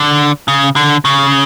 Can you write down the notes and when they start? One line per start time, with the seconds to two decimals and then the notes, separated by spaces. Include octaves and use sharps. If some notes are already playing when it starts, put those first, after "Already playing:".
Already playing: D3
0.48 C#3
0.76 D3
1.05 C#3